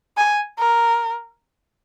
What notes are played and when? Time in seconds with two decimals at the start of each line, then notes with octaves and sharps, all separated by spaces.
0.17 G#5
0.59 A#4